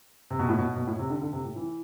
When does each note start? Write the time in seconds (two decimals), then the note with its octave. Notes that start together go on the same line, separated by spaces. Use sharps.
0.31 C3
0.39 B2
0.49 A2
0.58 B2
0.76 B2
0.87 A2
0.99 C3
1.10 D3
1.22 D3
1.33 C3
1.45 A2
1.56 E3